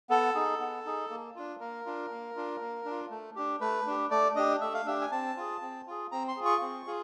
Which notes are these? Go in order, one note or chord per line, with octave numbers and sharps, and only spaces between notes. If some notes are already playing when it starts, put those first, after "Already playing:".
B3 A4
D#4 G#4
B3
D#4 G#4
A#3
D4 F4
A#3 A#4
D4 F4
A#3
D4 F4
A#3
D4
F4
A3
D4 G4
A3 B4
D4 G4
A3 D5
D4 G4 D#5
A3 E5
F5
D4 G4 E5
G#5
C4 A5
F4 G#4
C4
F4 G#4
C4 A#5
C6
F4 G#4
C#6
C4
F4 G#4